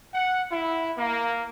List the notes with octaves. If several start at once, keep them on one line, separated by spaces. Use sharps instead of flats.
F#5
E4
A#3